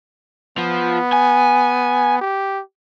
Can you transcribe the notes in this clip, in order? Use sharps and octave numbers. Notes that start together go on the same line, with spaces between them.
F3 B3
G#5
G4